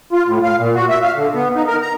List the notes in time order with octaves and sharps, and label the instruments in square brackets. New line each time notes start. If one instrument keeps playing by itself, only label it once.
[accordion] F4
A2
F5
A#2
F#4
E5
F5
D3
B3
D#4
A#4
A#5